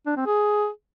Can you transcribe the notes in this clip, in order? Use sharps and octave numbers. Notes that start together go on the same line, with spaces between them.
D4
C4
G#4